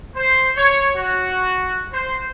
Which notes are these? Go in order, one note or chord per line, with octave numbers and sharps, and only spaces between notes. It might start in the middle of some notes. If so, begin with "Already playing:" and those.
C5
C#5
F#4
C5